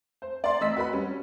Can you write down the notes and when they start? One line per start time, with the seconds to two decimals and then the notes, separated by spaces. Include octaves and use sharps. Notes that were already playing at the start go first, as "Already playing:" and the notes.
0.22 C5
0.44 D5 C6
0.61 A1 D#5 E6 B6
0.76 F#4 A#4 B4 B5
0.93 G3 C#4